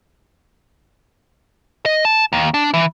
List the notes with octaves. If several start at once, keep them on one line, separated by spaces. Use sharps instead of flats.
D#5
A5
D#2
D4
E3